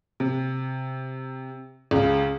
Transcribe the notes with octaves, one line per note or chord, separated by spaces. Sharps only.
C3
C#2 C#3